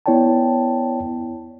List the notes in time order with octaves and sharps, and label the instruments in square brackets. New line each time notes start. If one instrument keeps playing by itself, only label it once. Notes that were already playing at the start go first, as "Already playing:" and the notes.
[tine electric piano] B3 E4 C#5 D5 G5 A5